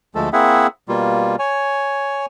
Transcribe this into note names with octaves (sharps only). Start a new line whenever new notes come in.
D2 F3 G#3 A3 A4
A#3 C4 E4 G#4 E5 F#5
B2 G3 A#3 F4
C#5 G#5